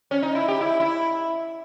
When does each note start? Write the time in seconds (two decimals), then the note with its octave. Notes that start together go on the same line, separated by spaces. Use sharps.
0.11 C#4
0.22 D#4
0.35 E4
0.48 G4
0.61 E4
0.80 E4